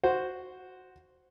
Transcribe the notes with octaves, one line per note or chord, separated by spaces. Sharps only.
F#4 C5